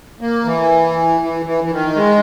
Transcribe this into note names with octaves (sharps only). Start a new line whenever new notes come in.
A#3
E3
E3
E3
E3
D#3
G#3